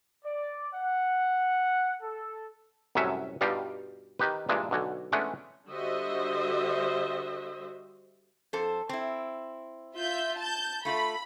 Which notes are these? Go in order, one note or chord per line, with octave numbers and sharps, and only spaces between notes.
D5
F#5
A4
C2 F#2 A2 F#3 C#4 E5
G2 B2 G3 D#4 F4 G4
D#3 D#4 G4 B4
G2 A#2 E3 G#3 D4
B1 D3 F#4 G#5
E3 G#3 A3 B3 C#4 D4
D3 G3 F#4 C5 D#5 E5
F2 A4 C5
C4 E4
F4 E5 G6
A5 G6
A3 F4 A4 B5